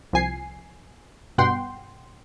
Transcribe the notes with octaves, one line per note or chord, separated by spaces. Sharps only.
C2 F3 G#5 C7
G2 B2 F#5 G5 C6